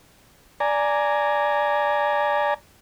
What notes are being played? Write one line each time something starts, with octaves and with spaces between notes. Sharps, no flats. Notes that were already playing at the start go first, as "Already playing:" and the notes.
D5 G#5 A#5